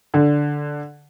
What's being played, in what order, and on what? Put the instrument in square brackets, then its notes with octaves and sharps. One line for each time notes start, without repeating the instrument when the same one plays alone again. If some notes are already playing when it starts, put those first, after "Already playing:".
[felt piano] D3